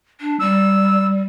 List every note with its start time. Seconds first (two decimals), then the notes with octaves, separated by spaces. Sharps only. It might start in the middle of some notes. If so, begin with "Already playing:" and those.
0.20 D4
0.40 G3 E6